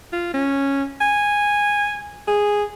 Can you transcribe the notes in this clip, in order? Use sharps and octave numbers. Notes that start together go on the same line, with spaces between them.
F4
C#4
G#5
G#4